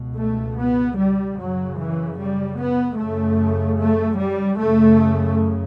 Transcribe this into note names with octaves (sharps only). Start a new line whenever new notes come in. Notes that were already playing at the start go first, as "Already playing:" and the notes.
Already playing: C#2 B2
A3
B3
G3
F#2 C#3 F#3
E3
G3
B3
F#2 C#3 A3
A3
G3
F#2 C#3 A3